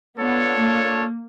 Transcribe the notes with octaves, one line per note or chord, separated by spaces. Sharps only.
B3 D4 F4 A4 C#5
A#3